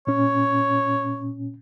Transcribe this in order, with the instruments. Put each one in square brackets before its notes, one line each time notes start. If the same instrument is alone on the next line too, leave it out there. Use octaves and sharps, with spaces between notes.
[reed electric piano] A#2 C#4 [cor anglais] C#5